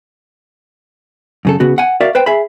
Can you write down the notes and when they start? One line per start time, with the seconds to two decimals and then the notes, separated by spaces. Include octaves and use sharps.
1.45 F#2 C#3 A4
1.60 C#3 B3 F#4
1.78 F#5 G#5
2.01 F#4 A#4 D5 E5 F5
2.15 B4 C5 G5
2.26 G#4 E5 B5